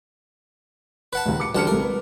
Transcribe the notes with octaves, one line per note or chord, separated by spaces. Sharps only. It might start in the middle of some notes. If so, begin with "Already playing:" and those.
B4 F#5 A5
A#1 D#2
D6 C#7
A1 D2 G3 A5 F6 C#7
C2 A4 A#4
B4